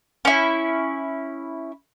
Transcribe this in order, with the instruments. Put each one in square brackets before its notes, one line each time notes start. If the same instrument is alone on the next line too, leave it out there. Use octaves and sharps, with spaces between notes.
[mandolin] C#4 E4